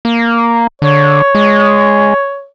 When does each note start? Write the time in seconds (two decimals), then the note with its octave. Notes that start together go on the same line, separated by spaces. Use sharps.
0.05 A#3
0.82 D3 C#5
1.35 G#3